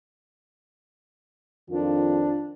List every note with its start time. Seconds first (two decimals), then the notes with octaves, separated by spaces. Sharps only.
1.70 F2 D#3 D4 F4